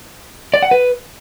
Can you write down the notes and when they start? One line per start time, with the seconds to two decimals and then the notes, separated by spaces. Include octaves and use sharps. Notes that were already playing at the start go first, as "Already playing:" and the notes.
0.54 D5
0.62 F#5
0.71 B4